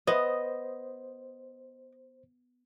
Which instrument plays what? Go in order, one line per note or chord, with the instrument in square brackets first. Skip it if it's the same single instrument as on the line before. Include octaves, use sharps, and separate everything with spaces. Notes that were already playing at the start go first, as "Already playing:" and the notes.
[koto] B3 [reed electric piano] C5 [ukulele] D#5